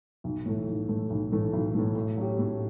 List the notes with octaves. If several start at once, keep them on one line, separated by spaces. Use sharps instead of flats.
B1
A2 E3 A3
B1
A2 E3 A3
B1
A2 E3 A3
B1
A2 E3 A3
A2
F#3 C#4 G4
A2